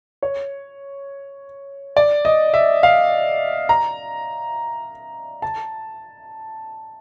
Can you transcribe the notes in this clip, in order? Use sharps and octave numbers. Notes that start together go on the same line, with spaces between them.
C#5
D5
D#5
E5
F5
A#5
A5